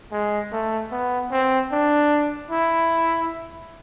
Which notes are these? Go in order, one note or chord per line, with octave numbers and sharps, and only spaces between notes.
G#3
A3
B3
C4
D4
E4